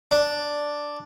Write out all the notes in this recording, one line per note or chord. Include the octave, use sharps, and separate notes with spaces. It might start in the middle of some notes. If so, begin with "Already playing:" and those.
D4